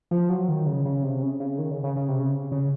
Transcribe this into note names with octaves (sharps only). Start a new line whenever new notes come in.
F3
F#3
D#3
C#3
C#3
C3
C#3
C#3
D#3
C#3
C#3
C#3
C3
C#3
C#3